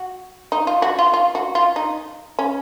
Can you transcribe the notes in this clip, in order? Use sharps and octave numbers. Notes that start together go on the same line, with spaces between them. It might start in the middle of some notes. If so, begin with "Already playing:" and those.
Already playing: F#4
D#4
F4
F#4
F4
F4
F#4
F4
D#4
C#4